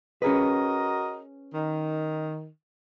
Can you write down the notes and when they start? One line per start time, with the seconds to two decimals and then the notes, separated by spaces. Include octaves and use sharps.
0.22 C#4 F#4 G#4 A#4 B4 D#5
1.53 D#3